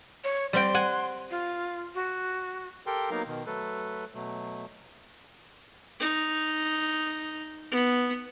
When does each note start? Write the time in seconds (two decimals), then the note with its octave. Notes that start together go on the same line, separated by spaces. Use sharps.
0.24 C#5
0.53 G3 C4 G5 C6
0.74 F#5 G#5
1.31 F4
1.95 F#4
2.86 G4 A4 A#4 G5 C6
3.11 F#3 A#3 B3 D#4 A#4 F5
3.27 B2 D#3
3.46 F#3 A3 A4 B4
4.14 B2 F#3 A3
6.00 D#4
7.71 B3